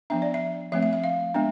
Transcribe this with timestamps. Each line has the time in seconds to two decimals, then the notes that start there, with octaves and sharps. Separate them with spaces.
0.10 F3 B3 D4 E5
0.22 D5
0.34 E5
0.72 F3 A3 C4 E5
0.83 E5
0.93 E5
1.04 F5
1.34 G#3 B3 D4